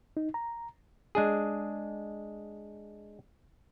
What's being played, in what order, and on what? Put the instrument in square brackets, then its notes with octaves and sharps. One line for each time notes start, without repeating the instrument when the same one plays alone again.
[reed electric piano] D#4
A#5
[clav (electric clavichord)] G#3 D4 G#4